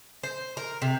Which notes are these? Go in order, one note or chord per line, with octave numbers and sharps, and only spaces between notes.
C5
A#4
C3